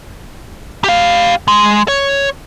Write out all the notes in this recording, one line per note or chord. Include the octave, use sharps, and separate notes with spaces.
G4 F5
G#3
C#5